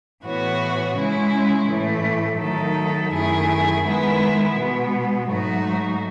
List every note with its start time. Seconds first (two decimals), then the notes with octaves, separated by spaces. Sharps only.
0.24 A2 E3 B3 F#4 C#5
0.96 C#3 G#3 C#4 E4
1.68 A2 E3 A3
2.40 D#3 F#3 A3 D#4 A4
3.12 F#2 D#3 A3 E4 G#4
3.84 D#3 G#3 B3 E4 B4
4.56 B2 G#3 B3
5.28 G#2 F#3 A3 D#4 F#4